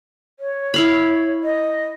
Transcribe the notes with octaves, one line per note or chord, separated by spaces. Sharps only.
C#5
E4 F5 B5
D#5